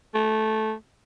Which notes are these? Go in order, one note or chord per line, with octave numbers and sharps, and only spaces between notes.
A3